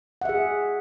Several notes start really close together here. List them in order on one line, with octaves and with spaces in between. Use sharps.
F#5 E5 G#4